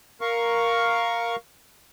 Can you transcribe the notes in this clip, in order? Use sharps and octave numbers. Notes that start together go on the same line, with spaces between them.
A#4 F5 C#6